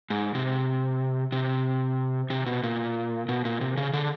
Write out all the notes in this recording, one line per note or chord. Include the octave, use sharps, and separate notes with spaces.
G#2
C3
C3
C3
B2
A#2
B2
A#2
C3
C#3
D3